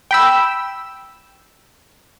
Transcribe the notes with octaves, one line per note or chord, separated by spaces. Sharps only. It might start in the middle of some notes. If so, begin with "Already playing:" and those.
G5 B5 E6